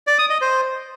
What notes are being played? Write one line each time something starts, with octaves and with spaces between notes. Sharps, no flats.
D5
D#6
D#5
C5